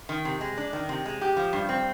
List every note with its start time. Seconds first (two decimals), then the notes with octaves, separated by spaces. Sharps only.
0.09 D#3
0.25 C3
0.41 G#3
0.57 D4
0.73 D#3
0.89 C3
1.06 G#3
1.21 G4
1.37 F3
1.53 G2
1.69 C4